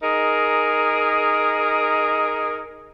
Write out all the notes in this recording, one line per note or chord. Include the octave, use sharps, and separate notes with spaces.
D#4 G#4 A#4